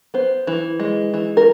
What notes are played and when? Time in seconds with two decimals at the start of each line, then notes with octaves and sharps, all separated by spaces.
0.14 B3 C5
0.47 E3
0.80 G#3
1.14 E3
1.37 A#4